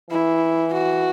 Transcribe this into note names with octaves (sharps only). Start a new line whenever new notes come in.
E3 E4
F#4